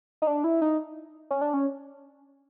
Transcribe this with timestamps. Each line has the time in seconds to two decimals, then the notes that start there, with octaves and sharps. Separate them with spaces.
0.22 D#4
0.27 D4
0.44 E4
0.61 D#4
1.30 C#4
1.41 D4
1.54 C#4